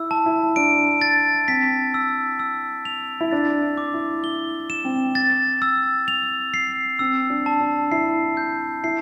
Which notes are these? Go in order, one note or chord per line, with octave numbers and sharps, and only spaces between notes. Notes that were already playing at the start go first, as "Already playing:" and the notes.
Already playing: E4 E6
A5
E4
D4 D7
A6
C4 B6
E6
E6
F7
E4
D4 A6
D6
E4
E4 G7
E7
C4
A6
E6
F7
C7
C4 E6
D4
A5
D4
E4 C7
G6
E4 C7